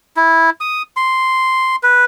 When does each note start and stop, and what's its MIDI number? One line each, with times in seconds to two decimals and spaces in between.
0.17 0.50 64
0.61 0.82 87
0.97 1.76 84
1.83 2.05 71